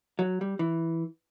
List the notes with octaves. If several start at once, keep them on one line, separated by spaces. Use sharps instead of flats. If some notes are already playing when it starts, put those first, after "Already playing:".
F#3
G3
E3